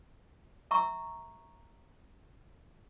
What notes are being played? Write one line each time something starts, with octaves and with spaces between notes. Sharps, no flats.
E5 A#5 C#6 E6